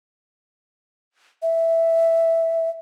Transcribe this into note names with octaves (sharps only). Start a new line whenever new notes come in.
E5